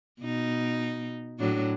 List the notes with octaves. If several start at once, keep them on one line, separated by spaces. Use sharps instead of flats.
B2 D#4
A2 F#3 D4